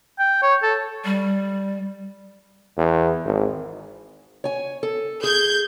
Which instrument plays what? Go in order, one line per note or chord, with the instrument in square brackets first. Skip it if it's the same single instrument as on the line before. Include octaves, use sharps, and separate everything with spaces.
[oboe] G5
C#5
A4
[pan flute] G3
[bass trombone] E2
G#1
[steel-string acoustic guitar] C#5 G#5
A4
[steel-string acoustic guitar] G#4 [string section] G6 G#6